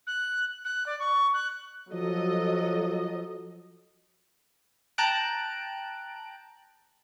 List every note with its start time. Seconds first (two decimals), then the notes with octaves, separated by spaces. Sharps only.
0.07 F#6
0.65 F#6
0.86 D5
1.00 C#6
1.34 F#6
1.93 F3 F#3 A4 D#5
4.98 G5 A5 A#5 F#6 D7